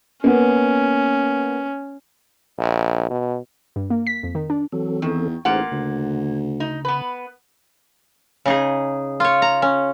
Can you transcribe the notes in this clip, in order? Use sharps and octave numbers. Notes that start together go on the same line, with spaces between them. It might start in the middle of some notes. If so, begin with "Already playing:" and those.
A#3 B3 C#4
A#1
B2
G2
A#3
B6
F2
D#3
D4
E3 F#3 C4 A4
E2 D#3
A1 A#3 D#4 F4 G#4 C5 F#5
D2 C#3
D#4
B3 B4
C#3 D#4 G#4
F4 C#5
A#5
C#4